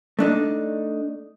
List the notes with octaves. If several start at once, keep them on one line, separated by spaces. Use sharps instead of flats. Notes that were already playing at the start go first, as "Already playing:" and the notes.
A3 D4 D#4